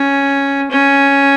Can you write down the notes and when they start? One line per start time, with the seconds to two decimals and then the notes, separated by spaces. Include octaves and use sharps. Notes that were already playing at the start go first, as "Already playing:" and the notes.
Already playing: C#4
0.71 C#4